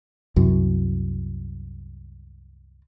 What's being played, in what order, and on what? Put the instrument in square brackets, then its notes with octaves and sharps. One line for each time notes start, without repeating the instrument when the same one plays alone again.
[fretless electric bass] C2 F#2